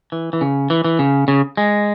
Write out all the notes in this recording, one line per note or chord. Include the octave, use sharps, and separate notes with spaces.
E3
E3
C#3
E3
E3
C#3
C#3
G#3